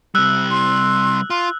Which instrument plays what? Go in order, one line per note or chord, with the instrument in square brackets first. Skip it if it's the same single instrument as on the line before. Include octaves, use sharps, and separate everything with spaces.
[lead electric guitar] C3 G3 [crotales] E6 F#6
[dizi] C6
[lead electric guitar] F4 [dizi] C6